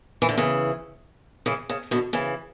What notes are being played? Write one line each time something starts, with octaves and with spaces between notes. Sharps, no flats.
E3
D3
C#3 E3
C#3 E3
C#3
B2 D3
C#3 E3